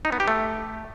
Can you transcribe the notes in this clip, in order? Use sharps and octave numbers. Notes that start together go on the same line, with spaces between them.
D#4
B3
G4
A3